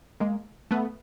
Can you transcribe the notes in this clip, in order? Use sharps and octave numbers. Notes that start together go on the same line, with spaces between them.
G#3 A#3
A3 B3